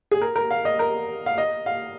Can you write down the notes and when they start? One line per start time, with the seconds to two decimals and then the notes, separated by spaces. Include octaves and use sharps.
0.11 G#4
0.22 A#4
0.36 A#4
0.51 F5
0.65 D#5
0.79 A#4
1.26 F5
1.38 D#5
1.66 F5